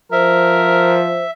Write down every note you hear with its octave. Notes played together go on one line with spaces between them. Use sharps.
F3 A#4 C5 E5